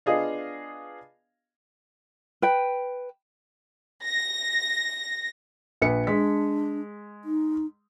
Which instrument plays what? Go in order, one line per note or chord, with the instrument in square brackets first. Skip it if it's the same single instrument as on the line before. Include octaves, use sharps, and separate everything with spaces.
[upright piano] B3 D4 F4 G#4 D#5 F5
[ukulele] B4 G5
[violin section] A#6
[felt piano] A#1 B4 C#7
[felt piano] G#3 B6 [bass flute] D4
[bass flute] D#4